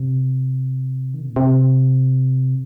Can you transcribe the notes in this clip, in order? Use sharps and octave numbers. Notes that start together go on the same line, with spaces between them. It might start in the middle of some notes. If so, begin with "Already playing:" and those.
Already playing: C3
D#3
C3
A#2
C3